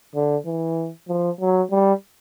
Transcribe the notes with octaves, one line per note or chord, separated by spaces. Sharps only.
D3
E3
F3
F#3
G3